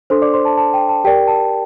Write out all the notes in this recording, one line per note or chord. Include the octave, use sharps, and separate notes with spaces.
D4 A4 C5 C6
D5 D6
C5 C6
A5
A5
G5
A5
G4 A#4 D5 G5
A5